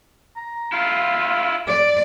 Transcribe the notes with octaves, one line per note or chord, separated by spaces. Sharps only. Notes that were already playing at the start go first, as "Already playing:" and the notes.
A#5
E4 F4 F5
D5 D6